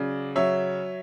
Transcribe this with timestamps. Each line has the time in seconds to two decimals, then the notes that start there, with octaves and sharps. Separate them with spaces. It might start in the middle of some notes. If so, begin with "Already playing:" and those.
Already playing: C#3 F#3 D5
0.36 F#3 C#5 E5